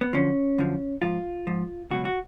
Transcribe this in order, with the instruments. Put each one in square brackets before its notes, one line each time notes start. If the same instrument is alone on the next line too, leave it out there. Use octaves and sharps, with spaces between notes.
[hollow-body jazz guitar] B3
F#2 D3 F3 C#4
F#2 D3 F3
G#2 F3 F4
G#2 F3
C#2 B2 F#3 F#4
F#4